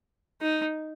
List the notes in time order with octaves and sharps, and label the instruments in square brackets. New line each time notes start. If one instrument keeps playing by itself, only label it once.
[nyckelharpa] D#4